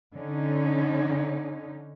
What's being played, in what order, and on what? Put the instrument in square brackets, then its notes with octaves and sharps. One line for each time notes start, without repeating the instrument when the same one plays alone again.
[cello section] D3 C#4 D#4